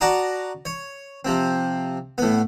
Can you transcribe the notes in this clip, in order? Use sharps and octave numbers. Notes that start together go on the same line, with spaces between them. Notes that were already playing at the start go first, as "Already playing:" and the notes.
F#4 D5 A5 A#5 D#6
C#5
C3 F3 C4
A2 B3